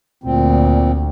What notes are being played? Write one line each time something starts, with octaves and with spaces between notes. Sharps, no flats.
D2 A#2 C4